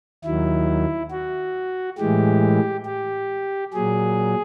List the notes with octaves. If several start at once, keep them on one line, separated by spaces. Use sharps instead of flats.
D#2 D#3 F#3 E4
F#4
A2 E3 G#3 G4
G4
A#2 F#3 G#4